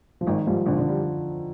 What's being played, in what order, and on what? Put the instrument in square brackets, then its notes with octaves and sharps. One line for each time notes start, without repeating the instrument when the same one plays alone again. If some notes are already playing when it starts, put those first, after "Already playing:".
[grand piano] F3
[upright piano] G#1 [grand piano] D#3
[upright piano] G#2 G3 [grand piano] F3
[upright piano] G#1 [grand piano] D3
[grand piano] D3
[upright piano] G3